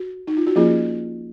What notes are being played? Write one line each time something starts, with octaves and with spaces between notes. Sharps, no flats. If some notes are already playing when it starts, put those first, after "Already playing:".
Already playing: F#4
D#4
F4
F#4
F3 A#3 C#4 F4 G#4